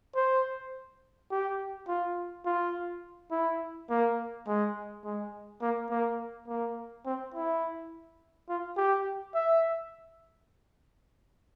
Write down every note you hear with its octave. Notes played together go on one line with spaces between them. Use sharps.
C5
G4
F4
F4
E4
A#3
G#3
G#3
A#3
A#3
A#3
C4
E4
F4
G4
E5